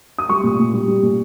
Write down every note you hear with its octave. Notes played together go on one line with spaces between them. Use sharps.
D#6
G3 C#6
A#2
A#2
G3
G3
A#2